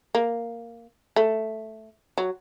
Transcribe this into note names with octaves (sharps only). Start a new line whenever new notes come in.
A#3
A3
F#3